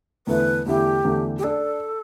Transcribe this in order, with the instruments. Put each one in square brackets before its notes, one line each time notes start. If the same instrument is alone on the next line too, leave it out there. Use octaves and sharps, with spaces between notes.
[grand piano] E2 D3 A3 E4 [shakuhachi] B4
[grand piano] E2 D3 A3 E4 [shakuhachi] G4
[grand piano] E2 D3 A3 E4
[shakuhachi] G4
[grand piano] D4 [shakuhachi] A4